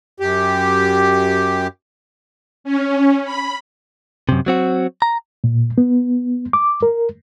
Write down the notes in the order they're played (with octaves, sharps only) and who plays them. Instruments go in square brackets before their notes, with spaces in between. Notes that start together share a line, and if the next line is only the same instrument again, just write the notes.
[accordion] F#2 G4
[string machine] C#4
B5
[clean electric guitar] F#2 C3
F#3 C4 F#4
A#5
[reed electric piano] A#2
B3
D6
A#4